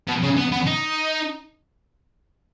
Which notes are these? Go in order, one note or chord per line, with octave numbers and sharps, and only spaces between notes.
B2
C#3
B3
B3
D#4